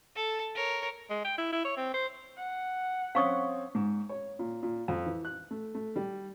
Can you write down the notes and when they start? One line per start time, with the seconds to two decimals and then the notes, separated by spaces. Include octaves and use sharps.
0.16 A4 A5
0.55 A#4 C#5
1.10 G#3
1.25 G5
1.38 E4
1.52 E4
1.65 C#5
1.77 C4
1.94 C5
2.37 F#5
3.15 C4 C#4 F5 C#6 D#6
3.75 G#2
4.09 C#5
4.39 A#2
4.63 A#2
4.88 F2
5.06 E3
5.25 F#6
5.51 A3
5.75 A3
5.96 G3